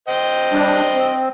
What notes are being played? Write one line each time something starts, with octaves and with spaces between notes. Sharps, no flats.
C5 D#5 G5
G3 D4
C4